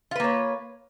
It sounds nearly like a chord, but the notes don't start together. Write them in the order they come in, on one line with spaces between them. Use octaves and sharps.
F4 B4 A#3 C#5